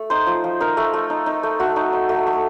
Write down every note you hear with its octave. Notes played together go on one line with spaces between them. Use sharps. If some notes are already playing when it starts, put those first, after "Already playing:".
Already playing: A3
D#4 C5
F3
F3
D#4 A#4
A3
A3
D#4
D#4
A3
A3 F#4
D#4
D#4
A3
A3